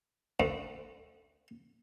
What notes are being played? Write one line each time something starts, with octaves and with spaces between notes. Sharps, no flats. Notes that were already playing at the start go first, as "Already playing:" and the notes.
D2